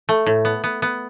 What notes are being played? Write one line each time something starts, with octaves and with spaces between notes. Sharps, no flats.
A3
A2
B3
B3
B3